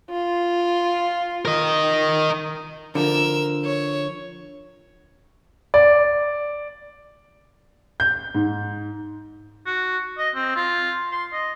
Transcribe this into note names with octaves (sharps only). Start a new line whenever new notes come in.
F4
A#4 D#5
D3 F3 A#4 E6
C#5
D5
G6
G#2
F#4
D#5
C4
F4
C6
D#5